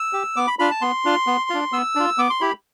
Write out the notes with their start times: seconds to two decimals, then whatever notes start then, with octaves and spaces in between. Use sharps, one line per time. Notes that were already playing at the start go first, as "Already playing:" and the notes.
Already playing: E6
0.13 G4
0.36 B3 D6
0.47 B5
0.59 D4 F4 B5
0.71 A5
0.81 B3 C6
1.05 D4 F4
1.27 B3
1.50 D4 F4
1.72 B3 E6
1.95 D4 F4
2.18 B3 D6
2.30 C6
2.41 E4 G4 B5